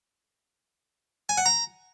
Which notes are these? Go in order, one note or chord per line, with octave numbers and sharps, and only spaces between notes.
G#5
F#5
A#5